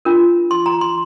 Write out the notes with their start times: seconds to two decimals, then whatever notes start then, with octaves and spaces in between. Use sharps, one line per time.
0.05 D4 F4 A#4
0.51 C6
0.66 A#5
0.81 C6